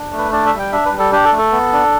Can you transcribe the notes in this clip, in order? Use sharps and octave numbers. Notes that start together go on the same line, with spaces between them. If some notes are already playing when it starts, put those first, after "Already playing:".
Already playing: D4
A3
B4
D4 D5
E5
G3
G5
D4 E5
B4
G3
A4
D4 G4
A4
A3
A4
B3
D4